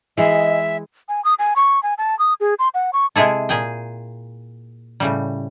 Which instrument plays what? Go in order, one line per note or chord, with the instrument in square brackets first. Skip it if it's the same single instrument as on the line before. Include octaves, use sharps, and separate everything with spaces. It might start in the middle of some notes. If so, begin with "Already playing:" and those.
[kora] E3 G#3 G#4 [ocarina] D#5 [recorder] E5
[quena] G#5
D#6
G#5
C#6
G#5
A5
D#6
G#4
C6
F#5
C#6
[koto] C3 G#3 E4 G#4 A4
A#2 G#4 G5
A2 C#3 G3